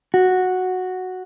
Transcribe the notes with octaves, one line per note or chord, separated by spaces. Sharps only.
F#4